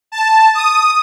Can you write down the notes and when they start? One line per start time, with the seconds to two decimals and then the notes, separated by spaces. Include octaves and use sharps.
0.12 A5
0.55 D#6